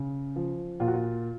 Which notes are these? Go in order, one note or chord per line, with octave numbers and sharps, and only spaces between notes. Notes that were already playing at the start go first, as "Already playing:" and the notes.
Already playing: C#3
F3
A#2 F4
F#4
F4